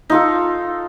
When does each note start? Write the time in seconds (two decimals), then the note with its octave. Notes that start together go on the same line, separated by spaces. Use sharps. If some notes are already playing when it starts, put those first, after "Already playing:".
0.10 D#4 F4 A4